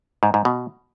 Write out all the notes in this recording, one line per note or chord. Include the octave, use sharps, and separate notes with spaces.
G#2
G#2
B2